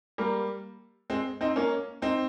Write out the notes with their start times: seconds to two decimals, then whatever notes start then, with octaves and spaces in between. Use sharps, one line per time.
0.18 G3 A#3
1.10 G#3 C4
1.41 C4 D#4
1.56 A#3 C#4
2.02 C4 D#4